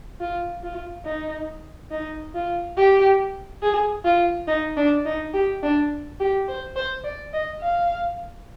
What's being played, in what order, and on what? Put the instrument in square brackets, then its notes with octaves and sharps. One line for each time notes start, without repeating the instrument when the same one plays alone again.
[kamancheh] F4
F4
D#4
D#4
F4
G4
G#4
F4
D#4
D4
D#4
G4
D4
G4
C5
C5
D5
D#5
F5